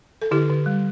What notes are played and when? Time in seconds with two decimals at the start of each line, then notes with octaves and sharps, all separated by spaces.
0.22 A4
0.31 D3 E4 G4
0.49 D3
0.66 G3